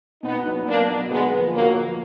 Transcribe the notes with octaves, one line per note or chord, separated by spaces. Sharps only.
B2 B3 D#4
F#3 B3 D#4 F#4
B2 A#3 D4
F#3 B3 D#4 F#4
D3 G#3 B3
F3 A#3
D3 F#3 A#3
F3 A#3